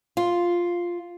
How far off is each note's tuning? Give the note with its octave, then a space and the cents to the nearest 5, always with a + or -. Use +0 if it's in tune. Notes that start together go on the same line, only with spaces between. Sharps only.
F4 +0